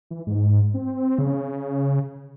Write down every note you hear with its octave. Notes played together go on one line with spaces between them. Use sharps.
E3
G#2
C4
C#3